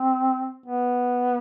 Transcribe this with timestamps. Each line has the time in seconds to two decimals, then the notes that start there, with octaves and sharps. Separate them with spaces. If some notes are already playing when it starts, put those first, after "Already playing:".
Already playing: C4
0.66 B3